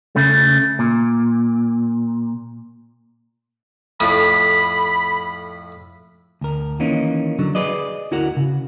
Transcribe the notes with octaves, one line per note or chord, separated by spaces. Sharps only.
C#3 A3
A#2
F2 A2 B5
D2 A#4
D#3 E3 A#3 C#4 D#4
D3 F#3
G#4 B4 D5 D#5
D2 E4 F#4 A#4 F#5
C#3